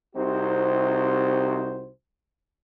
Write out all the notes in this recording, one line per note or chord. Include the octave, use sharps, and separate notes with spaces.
C2 C3 D#4 F#4 C5